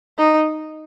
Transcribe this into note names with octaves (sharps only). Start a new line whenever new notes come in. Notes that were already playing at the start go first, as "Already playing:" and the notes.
D#4